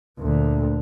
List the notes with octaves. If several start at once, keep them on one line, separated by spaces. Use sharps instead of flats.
D2 A#2